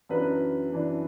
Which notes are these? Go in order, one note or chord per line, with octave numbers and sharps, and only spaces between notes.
F#2 E3 D4 B4
F#2 E3 D4